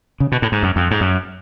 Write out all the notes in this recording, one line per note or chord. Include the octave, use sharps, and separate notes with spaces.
C#3
B2
A2
G#2
F#2
F2
G#2
F#2